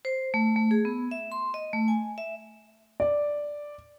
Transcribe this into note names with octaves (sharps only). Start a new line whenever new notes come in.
C5
A3
A3
G#4
B3
E5
C6
D#5
A3
G#5
E5
D5